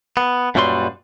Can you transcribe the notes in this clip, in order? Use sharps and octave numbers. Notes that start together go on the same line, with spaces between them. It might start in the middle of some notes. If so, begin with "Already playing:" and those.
B3
F#2 A#2 F#3 G3 B4 C6